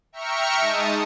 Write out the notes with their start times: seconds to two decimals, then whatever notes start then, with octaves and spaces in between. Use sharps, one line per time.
0.12 E5 G5 A#5 C#6 F6 C#7
0.60 G#3 D#4 A5 D#6